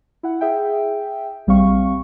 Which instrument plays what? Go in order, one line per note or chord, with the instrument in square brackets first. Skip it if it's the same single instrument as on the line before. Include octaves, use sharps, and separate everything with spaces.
[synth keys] E4 F#5
G#4 E5 G5
A#1 G3 C4 F5 C#6